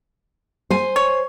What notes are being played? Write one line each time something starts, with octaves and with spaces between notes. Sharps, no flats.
C5 G#5
C#5